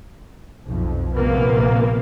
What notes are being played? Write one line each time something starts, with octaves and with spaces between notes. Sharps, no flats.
B1 F2
A#1 C3 A#3 B3